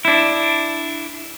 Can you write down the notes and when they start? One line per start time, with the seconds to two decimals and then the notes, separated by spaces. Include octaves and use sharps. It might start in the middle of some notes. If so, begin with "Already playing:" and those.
0.05 D4 E4